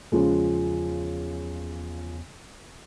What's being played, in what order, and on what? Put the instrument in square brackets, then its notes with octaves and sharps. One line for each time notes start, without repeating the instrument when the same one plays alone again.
[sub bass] E2 [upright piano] C#3 F3 G#3